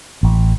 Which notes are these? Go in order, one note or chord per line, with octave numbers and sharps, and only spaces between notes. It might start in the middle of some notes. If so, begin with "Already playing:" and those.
A1